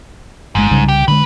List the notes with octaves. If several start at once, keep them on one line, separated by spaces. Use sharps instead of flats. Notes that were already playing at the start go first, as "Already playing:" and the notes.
G1 G#2 G#3
C2 C#3 G3
G4
D3 E3 G#3 B4